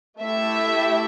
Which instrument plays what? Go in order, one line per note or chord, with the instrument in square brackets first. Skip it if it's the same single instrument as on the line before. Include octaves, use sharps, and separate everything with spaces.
[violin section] A3 E4 G4 E5